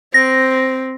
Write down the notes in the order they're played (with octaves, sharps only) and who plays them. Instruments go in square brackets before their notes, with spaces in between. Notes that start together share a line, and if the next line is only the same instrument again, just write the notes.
[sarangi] C4 [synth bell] A#6